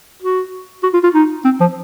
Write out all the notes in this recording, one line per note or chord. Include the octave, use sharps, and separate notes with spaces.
F#4
F#4
F4
F4
D#4
C4
F3